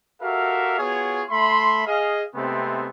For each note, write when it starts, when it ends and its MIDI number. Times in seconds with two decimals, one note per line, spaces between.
0.21 0.77 66
0.21 0.77 67
0.21 0.77 69
0.21 0.77 70
0.21 0.77 76
0.21 0.77 77
0.78 1.22 59
0.78 1.22 65
0.78 1.22 66
0.78 1.22 68
0.78 1.22 73
1.29 1.82 57
1.29 1.82 76
1.29 1.82 83
1.29 1.82 84
1.85 2.22 68
1.85 2.22 75
1.85 2.22 77
2.35 2.87 48
2.35 2.87 56
2.35 2.87 57
2.35 2.87 59
2.35 2.87 60